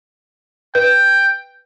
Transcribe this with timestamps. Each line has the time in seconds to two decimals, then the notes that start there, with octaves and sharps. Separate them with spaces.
0.75 B4 G5